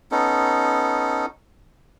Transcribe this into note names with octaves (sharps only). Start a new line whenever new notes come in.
B3 C#4 D#4 A4